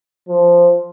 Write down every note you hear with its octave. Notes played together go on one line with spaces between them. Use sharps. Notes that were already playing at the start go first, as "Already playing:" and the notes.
F3